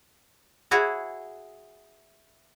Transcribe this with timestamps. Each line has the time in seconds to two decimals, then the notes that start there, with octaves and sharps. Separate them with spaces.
0.71 E4 F#4 G#4 C#5